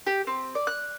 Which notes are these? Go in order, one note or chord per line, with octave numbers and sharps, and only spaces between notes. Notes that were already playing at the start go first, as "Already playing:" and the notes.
G4
C4
D5
F#6